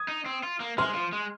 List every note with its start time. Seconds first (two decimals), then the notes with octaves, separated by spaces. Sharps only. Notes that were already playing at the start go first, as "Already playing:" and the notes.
Already playing: D#6 G#6
0.08 D#4
0.26 C4
0.43 F4
0.60 A#3
0.78 G#3 C6 F6
0.94 F3
1.13 G#3